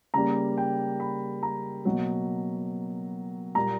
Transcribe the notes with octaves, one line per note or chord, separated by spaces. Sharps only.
C#3 G3 A#3 A#5
G5
B5
A#5
B2 F#3 A#3
A#2 G3 A#3 A#5